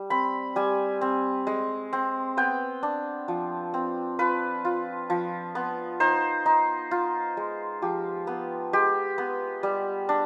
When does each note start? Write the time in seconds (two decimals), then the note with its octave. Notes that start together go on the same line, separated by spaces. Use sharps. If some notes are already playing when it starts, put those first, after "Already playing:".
Already playing: G3
0.10 C4 B5
0.56 G3 G#5
1.01 C4
1.47 G#3
1.93 C4
2.37 B3 G5
2.83 D4
3.28 F3
3.74 C4
4.19 F4 B4
4.65 F4
5.10 F3
5.55 B3
6.00 D#4 C5
6.46 D#4
6.91 F4
7.37 G#3
7.82 F3 G4
8.27 B3
8.73 G#3 G4
9.18 B3
9.63 G3
10.09 D4